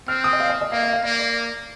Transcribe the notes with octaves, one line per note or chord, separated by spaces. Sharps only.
C4 F6
D#6
D#5
F5
D#5
D#5
A#3 F5
F5
F5
A#3 D5
D5